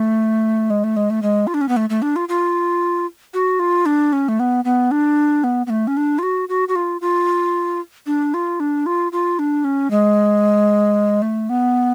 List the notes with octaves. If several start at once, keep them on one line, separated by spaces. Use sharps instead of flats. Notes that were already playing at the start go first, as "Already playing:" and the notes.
Already playing: A3
G#3
A3
G#3
A3
G#3
F4
D4
C#4
B3
A3
A3
D4
F4
F4
F#4
F4
D4
C#4
A3
B3
B3
D4
B3
B3
A3
C#4
D4
F4
F#4
F#4
F#4
F4
F4
D4
F4
D4
F4
F4
D4
C#4
G#3
A3
B3